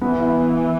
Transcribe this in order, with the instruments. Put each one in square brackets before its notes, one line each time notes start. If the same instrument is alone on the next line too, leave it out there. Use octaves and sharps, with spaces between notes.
[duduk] E3 [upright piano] B3
[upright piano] E4